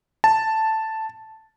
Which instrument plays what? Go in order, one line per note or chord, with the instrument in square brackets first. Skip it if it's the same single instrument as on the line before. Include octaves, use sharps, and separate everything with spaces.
[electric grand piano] A5